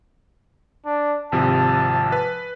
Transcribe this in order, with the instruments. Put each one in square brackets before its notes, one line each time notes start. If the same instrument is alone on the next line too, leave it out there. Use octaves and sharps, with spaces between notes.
[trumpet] D4
[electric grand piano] G#1 C3 F3 [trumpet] A5
[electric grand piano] B4